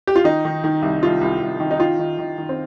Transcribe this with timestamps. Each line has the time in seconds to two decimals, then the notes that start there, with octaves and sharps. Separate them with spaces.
0.07 G4
0.16 F4
0.24 D#3 D#4
0.45 D#3
0.64 D#3
0.82 C2
1.03 C2 F4
1.21 C2
1.40 C2
1.60 D#3
1.71 D#4
1.79 D#3 F4
1.99 D#3
2.19 D#3
2.38 D#3
2.49 C4